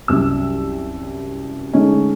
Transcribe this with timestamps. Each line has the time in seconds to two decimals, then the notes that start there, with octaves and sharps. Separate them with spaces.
0.08 C2 F#2 E6
1.73 D3 G#3 A3 C#4 D#4